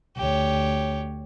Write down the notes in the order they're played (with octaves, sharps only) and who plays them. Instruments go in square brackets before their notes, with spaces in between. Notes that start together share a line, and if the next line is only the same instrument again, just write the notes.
[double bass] D2 [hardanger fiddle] G4 C#5